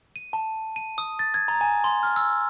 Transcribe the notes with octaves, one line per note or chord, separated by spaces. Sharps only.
D#7
A5
D#7
D#6
A6
G#6
A#5
G#5
C6
F6
E6